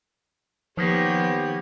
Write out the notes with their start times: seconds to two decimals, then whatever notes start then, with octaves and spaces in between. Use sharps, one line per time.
0.77 D#3 F3 A#3 B3 G4 C#5